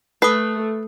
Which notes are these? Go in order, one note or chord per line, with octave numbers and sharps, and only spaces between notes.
A3 B4 D#6 C7